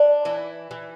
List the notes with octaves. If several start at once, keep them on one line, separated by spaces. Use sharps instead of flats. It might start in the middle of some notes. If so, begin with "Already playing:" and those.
Already playing: D4
E3 E4
E3